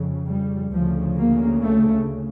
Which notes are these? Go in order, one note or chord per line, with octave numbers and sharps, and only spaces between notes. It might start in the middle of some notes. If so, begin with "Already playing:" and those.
Already playing: F2 C#3
G3
D2 C#3 F3
A#3
A3